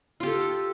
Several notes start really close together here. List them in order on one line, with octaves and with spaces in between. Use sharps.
F4 G4 A4